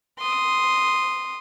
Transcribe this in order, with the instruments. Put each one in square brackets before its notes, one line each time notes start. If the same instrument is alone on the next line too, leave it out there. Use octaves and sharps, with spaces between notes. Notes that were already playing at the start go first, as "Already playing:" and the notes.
[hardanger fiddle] C6 D#6